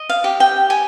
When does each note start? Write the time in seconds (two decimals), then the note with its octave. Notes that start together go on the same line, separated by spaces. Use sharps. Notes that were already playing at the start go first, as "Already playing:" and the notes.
Already playing: D#5
0.10 F5
0.24 G4
0.40 G5
0.70 G4 G#5